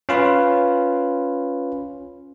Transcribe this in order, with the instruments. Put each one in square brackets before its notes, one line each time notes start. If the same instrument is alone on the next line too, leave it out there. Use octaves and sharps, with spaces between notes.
[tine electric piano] C#4 F4 B4